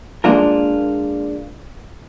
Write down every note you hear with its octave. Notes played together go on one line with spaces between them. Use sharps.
G#3 A#3 D4 F4 A#4